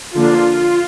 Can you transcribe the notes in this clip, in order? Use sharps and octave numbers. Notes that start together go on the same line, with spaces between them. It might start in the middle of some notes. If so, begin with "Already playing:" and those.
D3 F3 A#3 D4 F4